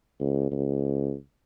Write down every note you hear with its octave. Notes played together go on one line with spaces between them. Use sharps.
C#2
C#2